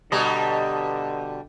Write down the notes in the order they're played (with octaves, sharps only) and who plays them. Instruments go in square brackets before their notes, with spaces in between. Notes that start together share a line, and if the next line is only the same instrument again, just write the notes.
[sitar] B2 G3 [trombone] D3 [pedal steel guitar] D#5 A5 A#5